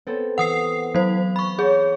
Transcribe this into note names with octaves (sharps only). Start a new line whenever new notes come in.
B3 C4 A4
E3 F#5 D#6 C7
F#3 C5
B5 C#6
G#4 C#5 A5